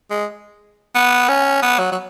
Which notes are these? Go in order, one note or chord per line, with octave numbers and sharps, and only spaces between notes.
G#3
B3
C#4
B3
F#3
F#3